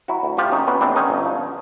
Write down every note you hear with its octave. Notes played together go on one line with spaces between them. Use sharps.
F#3 E4 F#4
D2
F3 F4 G4
D#2 C#4 D#4
E3 B3 C#4
A#1 C4 D4
D3 C#4 D#4
G1
F3